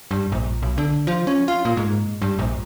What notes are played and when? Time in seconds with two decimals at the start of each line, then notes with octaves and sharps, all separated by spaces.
0.11 G2
0.32 A#1
0.62 B1
0.78 D3
1.07 F3
1.27 C#4
1.48 F4
1.65 A#2
1.77 G#2
2.22 G2
2.39 A#1